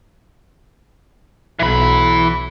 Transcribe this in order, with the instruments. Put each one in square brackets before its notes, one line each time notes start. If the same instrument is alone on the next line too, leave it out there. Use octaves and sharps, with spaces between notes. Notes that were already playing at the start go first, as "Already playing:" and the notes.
[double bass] B1 [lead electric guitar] E3 B5